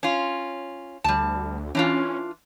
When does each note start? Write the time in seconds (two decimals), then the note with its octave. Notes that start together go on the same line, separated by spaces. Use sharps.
0.03 C#4 F4
1.04 D2 G3 A5
1.75 E3 C#4 D4 F4